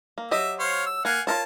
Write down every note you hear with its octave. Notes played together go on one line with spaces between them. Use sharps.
A#3
F#3 G4 D#5 E5
C5 C#5 F5
E6
A#3 F5 F#5 G#5
F4 A#4 C#5 A5